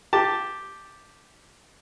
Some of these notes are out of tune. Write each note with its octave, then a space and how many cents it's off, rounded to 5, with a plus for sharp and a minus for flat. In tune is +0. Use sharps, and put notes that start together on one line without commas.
G4 +0 A5 +0